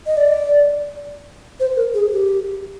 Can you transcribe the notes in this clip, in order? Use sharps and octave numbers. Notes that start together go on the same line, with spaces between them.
D#5
D5
C5
A#4
G#4
G4